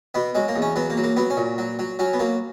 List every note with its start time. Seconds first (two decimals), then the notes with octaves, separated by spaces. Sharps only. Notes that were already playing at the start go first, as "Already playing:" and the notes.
0.14 B2 B3
0.35 F#3 G#3
0.48 A#3
0.55 E2
0.62 C#4
0.76 F#3 B3
0.90 A#3
0.97 F#3
1.04 A#3
1.16 F#3 B3
1.30 C#4
1.37 A#2
1.58 F#3
1.79 F#3
1.99 F#3 C#4
2.13 B3
2.19 F#3 A#3